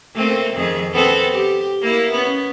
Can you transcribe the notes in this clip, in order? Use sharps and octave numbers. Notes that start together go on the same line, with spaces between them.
A3 A#3 C4
F2 D#3 G#4
B3 C4 A4
G4
A#3 E4
B3 C#4